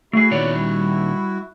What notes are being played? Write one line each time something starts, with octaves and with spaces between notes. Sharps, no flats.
A3 E4 F#4 G#4
A#2 D#3 B3 C#5 D5
G3